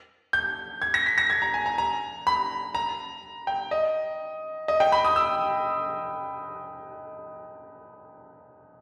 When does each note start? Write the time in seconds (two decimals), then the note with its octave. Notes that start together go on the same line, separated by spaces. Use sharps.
0.33 G6
0.82 G#6
0.94 A#6
1.06 B6
1.18 A#6
1.30 G#6
1.42 A#5
1.54 G#5
1.66 A#5
1.78 A#5
2.27 B5
2.75 A#5
3.47 G5
3.71 D#5
4.68 D#5
4.80 G5
4.92 B5
5.05 D#6
5.16 E6